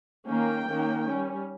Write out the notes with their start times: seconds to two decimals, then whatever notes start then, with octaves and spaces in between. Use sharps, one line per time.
0.28 D#3 A#3 C#4 G5
0.66 D#3 A#3 C#4
1.05 G3 C#4